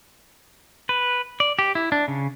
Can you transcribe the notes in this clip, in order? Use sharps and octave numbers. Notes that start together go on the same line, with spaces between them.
B4
D5
G4
E4
D4
C#3